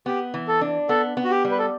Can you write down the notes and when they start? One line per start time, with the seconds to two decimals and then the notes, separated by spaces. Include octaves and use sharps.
0.06 B3 G4
0.34 E3
0.48 A4
0.61 D4
0.89 B3 A4
1.17 B3
1.24 F#4
1.30 G4
1.45 G3
1.51 B4
1.59 A4